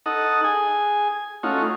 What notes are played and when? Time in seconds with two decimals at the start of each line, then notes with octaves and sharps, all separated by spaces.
0.06 D#4 A4 D#5 F#5
0.44 G#4 G#5
1.43 A3 C#4 D#4 F4 F#4